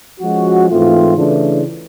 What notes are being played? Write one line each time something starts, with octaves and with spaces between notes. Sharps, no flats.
F3 G#3 C#4 F#4
G#2 E3 A3 C4 F4
C#3 E3 A3 D4